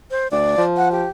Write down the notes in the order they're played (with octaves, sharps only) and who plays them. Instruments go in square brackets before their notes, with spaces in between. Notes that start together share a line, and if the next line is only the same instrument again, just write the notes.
[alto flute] C5
[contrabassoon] D2 [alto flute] D5
[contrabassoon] F3
[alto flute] F#5
G4